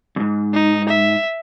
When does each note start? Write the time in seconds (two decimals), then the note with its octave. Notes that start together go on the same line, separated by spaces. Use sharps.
0.16 F2 G#2
0.53 D#4
0.89 E5